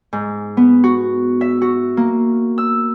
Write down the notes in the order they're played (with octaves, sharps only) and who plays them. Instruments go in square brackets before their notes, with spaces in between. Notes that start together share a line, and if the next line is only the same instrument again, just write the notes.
[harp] G#2
B3
F#4
E5
F#4
A#3
E6